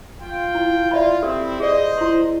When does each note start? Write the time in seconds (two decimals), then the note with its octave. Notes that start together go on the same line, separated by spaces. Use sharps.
0.20 F4 G5
0.55 E4
0.91 F4 D5 E5 B5
1.23 C4 E4 G4 A4
1.60 G#4 C5 D5 D#5
1.98 E4 C6